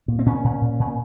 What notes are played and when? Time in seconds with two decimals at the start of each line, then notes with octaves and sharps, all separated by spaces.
0.08 A#2
0.19 C4
0.26 A#2 C#4
0.44 A#2
0.61 A#2
0.80 A#2